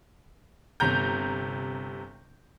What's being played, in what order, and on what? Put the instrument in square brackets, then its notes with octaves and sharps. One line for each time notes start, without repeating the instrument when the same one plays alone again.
[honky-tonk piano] G1 C3 A#5 G6